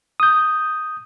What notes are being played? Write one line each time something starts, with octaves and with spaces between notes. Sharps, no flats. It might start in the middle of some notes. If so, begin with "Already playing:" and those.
D#6 G6